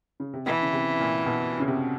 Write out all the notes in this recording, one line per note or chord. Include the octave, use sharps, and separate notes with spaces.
C#3
C3
B2 E3
C#3
C3
A#2
B2
C#3
C3